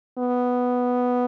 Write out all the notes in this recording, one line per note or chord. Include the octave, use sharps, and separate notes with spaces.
B3